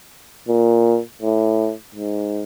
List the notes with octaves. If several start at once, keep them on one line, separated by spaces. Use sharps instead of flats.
A#2
A2
G#2